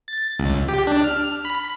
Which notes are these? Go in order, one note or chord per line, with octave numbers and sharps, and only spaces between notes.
A6
C#2
G4
D4
F6
B5